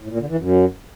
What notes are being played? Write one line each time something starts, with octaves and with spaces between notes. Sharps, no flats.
A2
A#2
D3
E3
F#2